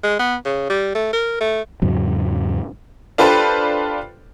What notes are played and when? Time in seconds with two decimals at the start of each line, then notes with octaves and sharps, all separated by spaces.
0.03 G#3
0.19 B3
0.45 C#3
0.70 G3
0.95 A3
1.13 A#4
1.40 A3
1.82 E2 G#2 C#3 F#3
3.18 D4 F4 G4 A4 B4 C5